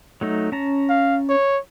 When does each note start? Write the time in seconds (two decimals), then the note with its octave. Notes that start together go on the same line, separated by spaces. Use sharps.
0.21 F#3 A3 D#4
0.52 C#4 A5 A#5
0.89 F5
1.29 C#5